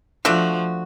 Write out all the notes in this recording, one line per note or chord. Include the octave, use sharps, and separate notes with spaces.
F3 A3 D4 F#4